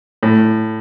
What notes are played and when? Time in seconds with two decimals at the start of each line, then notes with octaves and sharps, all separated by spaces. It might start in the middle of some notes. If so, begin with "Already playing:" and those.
0.23 A2